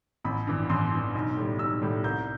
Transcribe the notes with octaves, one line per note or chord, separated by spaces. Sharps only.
A1 B5
G2 E3
A1 C6
G2 E3
B1
A2 G3
B1 E6
A2 G3
C2 G6